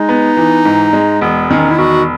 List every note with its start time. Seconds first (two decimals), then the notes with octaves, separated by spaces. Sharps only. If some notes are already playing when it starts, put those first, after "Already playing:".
Already playing: G#3 D#4
0.09 B3
0.37 E3
0.65 G#2
0.93 G#3
1.21 E1 B3
1.50 D#3 C#4
1.71 E4
1.78 E1 F#4